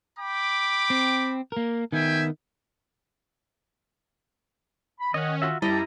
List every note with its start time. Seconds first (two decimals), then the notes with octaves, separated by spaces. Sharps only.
0.18 G5 B5 D6
0.90 C4
1.52 A#3 A#4
1.92 D#3 B3 E5 G5 G#5
5.00 B5
5.14 D#3 C#4 D#5 F#5
5.42 F4 F#4 E5
5.62 F#2 G3 E4 G4 D#5 A5 A#5